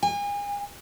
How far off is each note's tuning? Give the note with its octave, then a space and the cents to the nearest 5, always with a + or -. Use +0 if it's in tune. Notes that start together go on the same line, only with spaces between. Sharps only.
G#5 -35